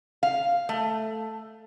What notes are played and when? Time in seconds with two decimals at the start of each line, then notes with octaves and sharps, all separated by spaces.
0.23 F5
0.69 A3